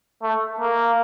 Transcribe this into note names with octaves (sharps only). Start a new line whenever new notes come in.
A3
A#3